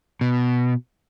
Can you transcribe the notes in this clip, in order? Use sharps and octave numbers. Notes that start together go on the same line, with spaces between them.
B2